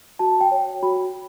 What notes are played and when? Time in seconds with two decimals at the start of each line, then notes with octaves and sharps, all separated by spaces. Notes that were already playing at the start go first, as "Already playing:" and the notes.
0.19 F#4 A5
0.41 G5
0.51 C#5
0.83 F#4 B5